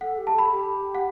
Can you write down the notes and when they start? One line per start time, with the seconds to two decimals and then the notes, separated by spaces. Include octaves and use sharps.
0.01 A4 F#5
0.18 G4
0.27 A5
0.35 A4 B5
0.52 G4
0.95 F#5